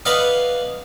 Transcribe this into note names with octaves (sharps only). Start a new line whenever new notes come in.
B4 D5 D#5 F5 F#5